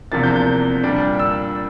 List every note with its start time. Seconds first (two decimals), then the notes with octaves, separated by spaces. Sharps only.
0.12 E2 C3 F3 A#3 D4 A6
0.23 G6
0.36 G6
0.83 A#2 G3 D4
1.19 E6